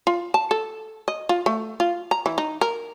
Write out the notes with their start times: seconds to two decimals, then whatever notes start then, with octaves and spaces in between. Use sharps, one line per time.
0.07 F4
0.34 A5
0.51 A4
1.08 D#5
1.29 F4
1.46 A3
1.80 F4
2.11 A#5
2.26 E3
2.38 D#4
2.61 A#4